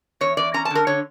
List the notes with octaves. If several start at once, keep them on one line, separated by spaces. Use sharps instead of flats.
E2 C#5
E2 D5
C#4 A#5
A5
D3 A#4
D3 C#5